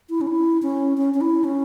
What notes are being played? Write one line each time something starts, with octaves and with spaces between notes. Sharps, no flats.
E4
C#4
E4
C#4
C#4
C#4
E4
C#4